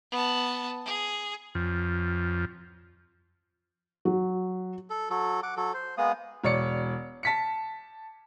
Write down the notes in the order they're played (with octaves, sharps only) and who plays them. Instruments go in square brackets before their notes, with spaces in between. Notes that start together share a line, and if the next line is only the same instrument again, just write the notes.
[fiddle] B3 A5
G#4
[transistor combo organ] F2
[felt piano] F#3
[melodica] A4
F#3 A4
F#5 D6
F#3 A4
C5
G#3 A#3 B3 D#6
[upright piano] E1 C#5 D5 C#7
A5 B6 C#7